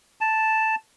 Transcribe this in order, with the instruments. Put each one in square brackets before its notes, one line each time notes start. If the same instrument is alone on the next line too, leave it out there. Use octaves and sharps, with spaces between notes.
[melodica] A5